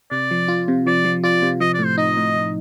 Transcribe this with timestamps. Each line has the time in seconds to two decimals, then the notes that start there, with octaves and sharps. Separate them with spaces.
0.11 C3 D5
0.31 F3
0.48 F4
0.68 C3
0.87 F3 D5
1.05 F3
1.23 F4 D5
1.42 C3
1.60 F3 D#5
1.74 D5
1.79 A2
1.85 C5
1.98 D#4 D#5
2.17 A2
2.36 A2